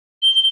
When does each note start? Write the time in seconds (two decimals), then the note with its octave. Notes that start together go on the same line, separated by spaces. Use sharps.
0.23 G7